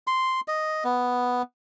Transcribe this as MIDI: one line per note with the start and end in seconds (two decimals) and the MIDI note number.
0.07 0.40 84
0.48 0.84 75
0.84 1.42 59